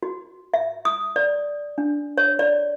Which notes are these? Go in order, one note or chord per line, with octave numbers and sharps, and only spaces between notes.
F#4
E5
D#6
D5
D4
C#5
D5